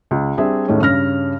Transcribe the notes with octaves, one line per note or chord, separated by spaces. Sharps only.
C#2
G3 C4 D4 G#4 E5
D#2 A2 D#3 G#3 A3 C#4
G2 C#3 C#4 F6 A#6